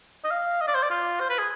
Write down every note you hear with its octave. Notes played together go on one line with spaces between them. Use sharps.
D#5
F5
D#5
D5
C5
D5
F4
C5
B4
G#4